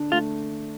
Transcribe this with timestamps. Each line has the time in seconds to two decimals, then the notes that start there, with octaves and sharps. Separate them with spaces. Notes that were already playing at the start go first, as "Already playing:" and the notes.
Already playing: D3 D4
0.11 A3 F4